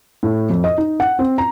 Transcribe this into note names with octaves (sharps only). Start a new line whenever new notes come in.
A2
F2
D#5
D#4
F#5
C4
A#5